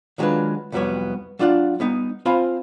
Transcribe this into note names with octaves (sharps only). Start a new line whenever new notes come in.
D#3 F#3 G#3 D4 F4 B4
C2 F2 F#3 G3 B3 C#5
F#3 D4 F4 D5 F#5
G3 B3 D#4
C4 F4 C5 F5 G#5 B5